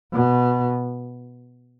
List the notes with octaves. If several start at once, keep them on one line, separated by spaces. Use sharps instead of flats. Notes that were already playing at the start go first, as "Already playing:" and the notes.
B2